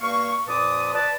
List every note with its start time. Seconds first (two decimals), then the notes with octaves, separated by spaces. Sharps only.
0.01 G2 A#3 F5 C#6
0.48 F2 A#2 B4 A5 D6 D#6
0.94 B4 D5 A5